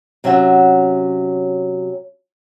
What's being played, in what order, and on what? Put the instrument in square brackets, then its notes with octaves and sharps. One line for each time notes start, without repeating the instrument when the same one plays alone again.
[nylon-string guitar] C3 F#3 C#4 E5 F#5